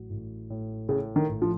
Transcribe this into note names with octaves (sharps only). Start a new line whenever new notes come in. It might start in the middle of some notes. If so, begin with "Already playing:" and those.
Already playing: A1 F#3
A1
A2
A2 C#3
D#3
A1
F3